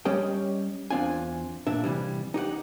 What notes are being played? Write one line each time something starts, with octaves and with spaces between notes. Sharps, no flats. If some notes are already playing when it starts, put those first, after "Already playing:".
G3 C#4 G4 D#5 G5
E2 C4 D4 F4 G#5
A#2 D4 E5
C3 E3 G3
D#4 G4 C#5 F#5